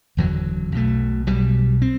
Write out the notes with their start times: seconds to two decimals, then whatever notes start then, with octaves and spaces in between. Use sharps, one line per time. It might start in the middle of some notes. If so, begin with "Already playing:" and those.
0.17 F#1 E2 D3 F#3
0.72 B1 B2 A3
1.27 B1 B2 G3
1.82 C4